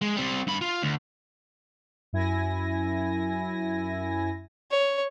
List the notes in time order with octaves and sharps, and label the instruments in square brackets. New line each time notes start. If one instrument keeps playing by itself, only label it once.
[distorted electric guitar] G#3
G3 C4
G2 B5
F4
D2
[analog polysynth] F#2 E4 G#5 A#6
[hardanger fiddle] C#5